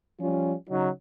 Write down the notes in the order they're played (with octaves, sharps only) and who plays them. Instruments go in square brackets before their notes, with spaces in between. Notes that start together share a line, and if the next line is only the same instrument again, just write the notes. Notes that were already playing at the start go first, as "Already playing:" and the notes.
[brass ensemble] F3 G3 C#4 F4
C#3 F#3 D#4